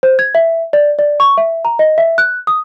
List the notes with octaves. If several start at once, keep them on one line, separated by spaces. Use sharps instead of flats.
C5
G#6
E5
D5
D5
C#6
E5
A#5
D#5
E5
F#6
D#6